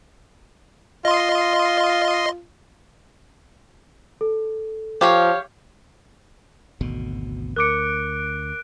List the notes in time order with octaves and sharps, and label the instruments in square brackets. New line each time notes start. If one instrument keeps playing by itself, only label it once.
[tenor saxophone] F4 [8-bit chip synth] D#5 C6
[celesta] A4
[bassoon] F3 [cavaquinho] G4 C#5 F5
[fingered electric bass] G#1 D2 B2
[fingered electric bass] D2 [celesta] A#4 D6 C#7 [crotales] F#6 D7